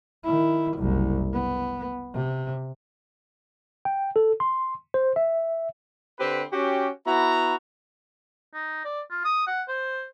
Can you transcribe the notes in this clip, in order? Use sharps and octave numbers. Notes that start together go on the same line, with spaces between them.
D#3 E4
F#1 C2
B3
C3
G5
A4
C6
C5
E5
D3 C4 G4 B4
C#4 F#4 G4
B3 E4 F#4 A#5
D#4
D5
F4
D#6
F#5
C5